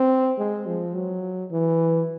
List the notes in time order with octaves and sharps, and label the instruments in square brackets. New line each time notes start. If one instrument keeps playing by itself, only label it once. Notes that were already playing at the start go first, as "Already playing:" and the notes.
Already playing: [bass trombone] C4
G#3
F3
F#3
E3